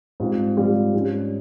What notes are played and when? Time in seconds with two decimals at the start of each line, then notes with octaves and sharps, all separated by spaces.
0.20 G#2 G3 C4 F4
0.57 G#2 G3 C4 F4
0.94 G#2 G3 C#4